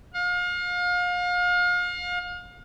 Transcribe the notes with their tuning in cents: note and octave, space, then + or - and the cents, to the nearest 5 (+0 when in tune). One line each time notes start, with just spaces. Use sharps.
F5 +35